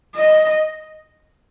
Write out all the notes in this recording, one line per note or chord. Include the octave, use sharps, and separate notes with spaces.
D#5